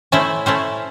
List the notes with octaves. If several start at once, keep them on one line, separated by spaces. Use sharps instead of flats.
A3 C#4 E4 C5 E5
A3 C#4 E4 C5 E5